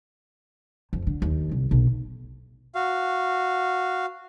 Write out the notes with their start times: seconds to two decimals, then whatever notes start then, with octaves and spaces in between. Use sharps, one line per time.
0.93 F2
1.07 D3
1.22 D#2
1.51 C2
1.71 B1
2.74 F#4 F5